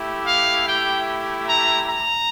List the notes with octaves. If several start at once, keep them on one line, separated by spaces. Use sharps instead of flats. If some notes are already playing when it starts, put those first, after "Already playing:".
Already playing: A3 E4 G4
F5
G5
A#5
A#5